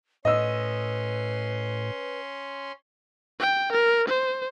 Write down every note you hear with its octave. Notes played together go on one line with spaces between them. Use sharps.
A2 C#4 B4 D#5 C6 E6
G5
A#4
C5